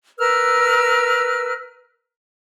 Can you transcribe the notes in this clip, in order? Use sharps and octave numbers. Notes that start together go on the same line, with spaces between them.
A#4 B4 E6 F6